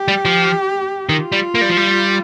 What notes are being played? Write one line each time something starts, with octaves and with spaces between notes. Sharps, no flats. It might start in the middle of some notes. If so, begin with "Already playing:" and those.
Already playing: G4
G3
F3
D#3 F4
G3
A#3
G3
F3
G3